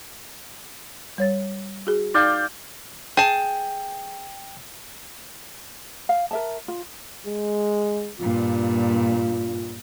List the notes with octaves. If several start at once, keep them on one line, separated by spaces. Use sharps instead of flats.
G3 C#5 A6
F#4 G#4
D#4 D5 F5 G5
G#4 G5 A5
F5
A#4 E5 A5
F4
G#3
G2 A#2 F4